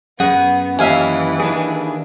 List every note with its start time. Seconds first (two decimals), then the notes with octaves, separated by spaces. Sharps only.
0.20 F#2 B3 G#4 F#5
0.79 D#2 E3 E5 F5 G#5
1.40 D#3 D4 G#4